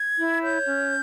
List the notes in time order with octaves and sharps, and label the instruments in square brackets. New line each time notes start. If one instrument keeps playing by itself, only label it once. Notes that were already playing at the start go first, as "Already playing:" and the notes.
Already playing: [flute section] G#6
E4
C#5 G6
C#4